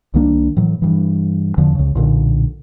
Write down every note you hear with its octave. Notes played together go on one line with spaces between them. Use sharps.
C2 D#3 A#3 D4
A2 E3 F#3
G2 E3
E2 D3 F3
C#2 C#3
B1 A#2 D3